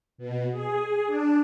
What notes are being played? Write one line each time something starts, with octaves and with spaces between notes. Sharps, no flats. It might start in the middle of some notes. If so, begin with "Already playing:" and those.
B2
G#4
D4